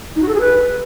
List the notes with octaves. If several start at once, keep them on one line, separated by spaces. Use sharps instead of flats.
D#4
F#4
A4
G#4
B4